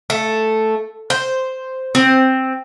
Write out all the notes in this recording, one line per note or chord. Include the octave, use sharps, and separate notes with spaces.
A3
C5
C4